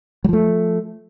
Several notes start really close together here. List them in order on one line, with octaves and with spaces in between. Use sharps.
F#3 F3 A3